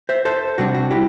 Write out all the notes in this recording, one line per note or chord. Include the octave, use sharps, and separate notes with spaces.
C5 E5
A4 C5
C3 G3 D4 F#4
F#4
E4 G4